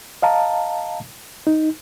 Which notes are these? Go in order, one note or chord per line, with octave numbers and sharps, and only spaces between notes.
D#5 F5 A5 A#5
D#4